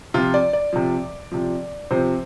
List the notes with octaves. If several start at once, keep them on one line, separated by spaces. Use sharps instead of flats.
C3 F3 F4
D5
D5
C3 F3
C3 F3
C3 F3 C5